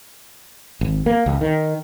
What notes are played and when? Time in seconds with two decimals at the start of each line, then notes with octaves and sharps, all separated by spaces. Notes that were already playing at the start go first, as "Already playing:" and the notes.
0.81 G#1
1.06 A#3
1.26 C#2
1.41 D#3